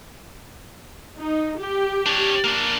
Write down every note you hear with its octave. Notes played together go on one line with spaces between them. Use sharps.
D#4
G4
D4 C#5
A#3 D4